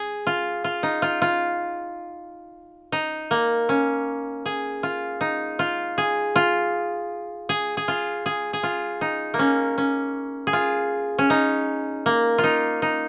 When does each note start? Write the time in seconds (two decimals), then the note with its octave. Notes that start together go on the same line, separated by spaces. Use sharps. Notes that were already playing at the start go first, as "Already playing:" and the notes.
Already playing: G#4
0.27 F4
0.64 F4
0.83 D#4
1.02 F4
1.22 F4
2.92 D#4
3.31 A#3
3.69 C#4
4.46 G#4
4.83 F4
5.21 D#4
5.59 F4
5.98 G#4
6.36 F4
7.49 G#4
7.77 G#4
7.88 F4
8.26 G#4
8.53 G#4
8.63 F4
9.01 D#4
9.34 A#3
9.39 C#4
9.78 C#4
10.47 G#4
10.53 F4
11.19 C#4
11.30 D#4
12.06 A#3
12.38 F4
12.44 D#4
12.82 D#4